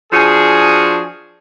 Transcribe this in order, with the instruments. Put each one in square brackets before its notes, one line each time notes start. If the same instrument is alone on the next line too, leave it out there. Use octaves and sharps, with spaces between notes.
[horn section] F3 D4 F#4 G#4